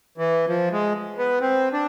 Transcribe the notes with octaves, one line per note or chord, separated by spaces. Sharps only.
E3
F3
G#3
B3
C4
D4